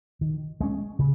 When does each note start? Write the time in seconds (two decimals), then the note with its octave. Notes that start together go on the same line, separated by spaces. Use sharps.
0.21 D#3
0.60 G#3 C#4
0.99 C#3